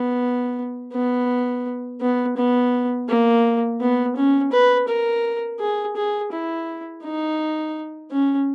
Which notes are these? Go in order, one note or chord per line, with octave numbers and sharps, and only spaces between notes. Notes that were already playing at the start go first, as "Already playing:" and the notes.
Already playing: B3
B3
B3
B3
A#3
B3
C#4
B4
A#4
G#4
G#4
E4
D#4
C#4